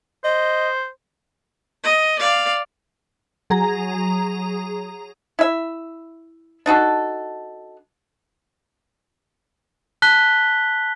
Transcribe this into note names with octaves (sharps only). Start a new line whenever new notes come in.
C5 D#5
D#5
D5 F5
F#3 G#4 A#5
E4 E5
D4 D#4 F#4 A4
A5 F#6 B6 G7